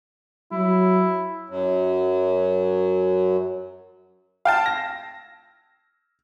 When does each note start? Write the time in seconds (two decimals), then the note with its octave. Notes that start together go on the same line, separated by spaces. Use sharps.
0.52 F#3 E4
1.50 F#2 F#3
4.45 F5 G5 A5
4.66 A#6